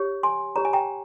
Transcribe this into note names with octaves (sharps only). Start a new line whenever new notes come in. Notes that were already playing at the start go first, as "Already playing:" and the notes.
Already playing: G4 C#5
G#5 C6
G4 C#5 A#5
G#5
G5 A#5